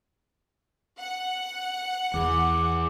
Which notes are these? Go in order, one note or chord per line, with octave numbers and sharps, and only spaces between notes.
F#5
E2 D6